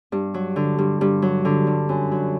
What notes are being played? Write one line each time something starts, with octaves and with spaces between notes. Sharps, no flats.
G2
F#3
D3
G2
G2
F#3
D3
G2
F#2
F#3